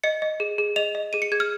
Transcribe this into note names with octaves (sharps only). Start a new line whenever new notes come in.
D#5 C#7
D#5
G#4
G#4
D#5 F7
D#5
G#4 D#7
C#7
G#4 G#6
F6